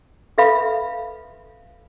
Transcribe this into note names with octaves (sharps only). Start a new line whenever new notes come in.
A4 B4 E5 F5 B5